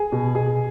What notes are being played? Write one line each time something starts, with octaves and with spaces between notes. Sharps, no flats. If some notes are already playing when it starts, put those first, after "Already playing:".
Already playing: G#4
B2
B2 G#4